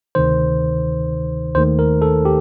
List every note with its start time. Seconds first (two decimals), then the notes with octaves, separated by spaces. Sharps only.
0.15 D2 C3 D#3 C5
1.55 D#2 D#3 A3 C5
1.79 A#4
2.02 A4
2.25 G4